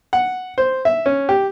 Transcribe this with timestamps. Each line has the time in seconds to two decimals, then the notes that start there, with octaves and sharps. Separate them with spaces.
0.13 F#5
0.58 C5
0.85 E5
1.06 C#4
1.29 G4